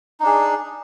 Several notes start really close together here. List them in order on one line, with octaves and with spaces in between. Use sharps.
D#4 D4 G#4